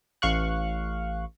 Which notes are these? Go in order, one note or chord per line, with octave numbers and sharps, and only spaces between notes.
A1 F5 C#6 F#6